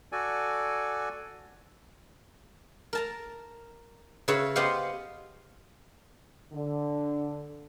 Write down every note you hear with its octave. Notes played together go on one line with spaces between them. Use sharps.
F#4 A4 D5 G#5
A#4 A5 A#5
C#3 F#4 B4 C#5 E5 B5
B3 G4 C5 D#5 F5 F#5
D3